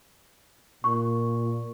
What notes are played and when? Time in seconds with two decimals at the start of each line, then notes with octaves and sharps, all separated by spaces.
0.84 A#2 C#6